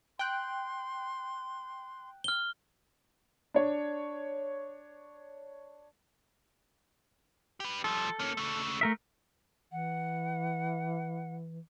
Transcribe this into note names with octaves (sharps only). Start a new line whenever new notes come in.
G5 C6 F#6
F6 G7
D4 C#5
G4 B4
F3 G3 A4
A#3 C#4
C#3 A3
A3 A#4 E5
E3 F#5